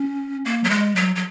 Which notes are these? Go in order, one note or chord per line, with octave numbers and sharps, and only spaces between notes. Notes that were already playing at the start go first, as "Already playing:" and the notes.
Already playing: C#4
A#3
F#3
G#3
F#3
F#3